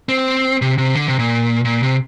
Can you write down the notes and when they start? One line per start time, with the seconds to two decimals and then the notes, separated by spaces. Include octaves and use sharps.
0.09 C4
0.62 C3
0.78 C3
0.95 D3
1.08 C3
1.19 A#2
1.65 A#2
1.83 C3